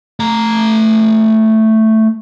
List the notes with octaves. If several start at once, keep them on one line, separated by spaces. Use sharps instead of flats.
A3 A#5